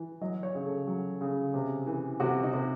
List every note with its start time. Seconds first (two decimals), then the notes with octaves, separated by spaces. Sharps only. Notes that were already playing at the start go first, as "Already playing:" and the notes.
Already playing: E3
0.21 F#3 D#5
0.43 C#5
0.55 C#3
0.66 A4
0.87 F#3
1.21 C#3
1.54 C3
1.87 E3
2.20 C3 F#4
2.43 D#4
2.53 C3